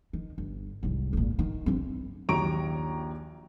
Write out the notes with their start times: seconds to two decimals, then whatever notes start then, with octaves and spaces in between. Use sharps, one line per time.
0.13 D#3
0.38 G1
0.83 C2 G#2
1.13 G#1 A#2
1.39 D#3
1.66 G1 C4
2.29 A#1 D#2 F#3 A#5 C#6 D7